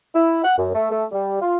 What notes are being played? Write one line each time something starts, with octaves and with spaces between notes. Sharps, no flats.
E4
F#5
F#2
A3
A3
G3
F4